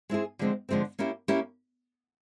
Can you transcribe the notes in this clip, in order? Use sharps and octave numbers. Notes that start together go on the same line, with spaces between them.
G#3 C4 E4 G#4
D3 F3 G#3 C4
D3 F3 G#3 C4
A#3 C#4 E4 G4
A#3 C#4 E4 G4